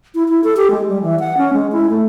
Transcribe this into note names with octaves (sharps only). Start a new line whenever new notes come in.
E4
E4
A4
G4
G#3
G3
E3
F#5
C#4
G#3
E4
A3